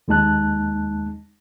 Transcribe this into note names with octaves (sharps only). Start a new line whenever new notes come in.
D#2 G#3 D#4 A5 F#6